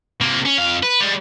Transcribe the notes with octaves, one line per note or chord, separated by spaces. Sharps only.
C3 A#3
C#4
F2 F5
B4
G3 G#3